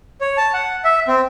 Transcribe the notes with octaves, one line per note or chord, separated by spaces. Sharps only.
C#5
A5
F#5
E5
C4